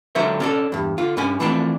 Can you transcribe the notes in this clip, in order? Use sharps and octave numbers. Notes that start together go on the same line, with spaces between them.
C#2 D3 F#3 C5 C#5 E5
C#4 D4 A4
E2 G2
D3 F4
G2 C#4 G#5
E3 F3 A3 C4 D4